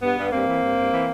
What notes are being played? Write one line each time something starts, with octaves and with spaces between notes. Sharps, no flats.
G2 B3
G2
G2 A#3 C4
E3
G2
G2
E3